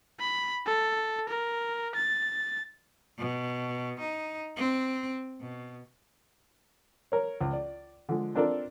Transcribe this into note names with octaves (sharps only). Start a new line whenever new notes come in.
B5
A4
A#4
A6
B2
D#4
C4
B2
A#4 C#5
C#2
D5
D3 F3 G#3
C4 D4 F4 A4 A#4 D5